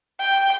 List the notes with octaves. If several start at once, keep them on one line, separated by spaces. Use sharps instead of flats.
G5